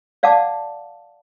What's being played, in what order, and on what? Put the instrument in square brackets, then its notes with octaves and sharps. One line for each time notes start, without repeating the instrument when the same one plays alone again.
[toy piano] D5 F5 F#5 A5 D6